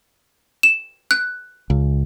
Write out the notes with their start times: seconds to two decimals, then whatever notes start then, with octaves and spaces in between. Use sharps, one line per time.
0.63 E7
1.11 F#6
1.70 C#2